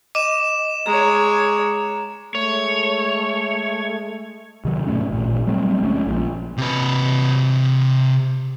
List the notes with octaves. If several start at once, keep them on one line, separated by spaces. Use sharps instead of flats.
D#5 D6 E7
G#3 C#5 A#5
G#3 A3 C#5
C3 D#3 F#3
G#2 B2 A3 C#4
A1 A#2
F#3 G3 A3 C4
D2 G#3 A3 C#4
A#1 A#2 F3
C3 B4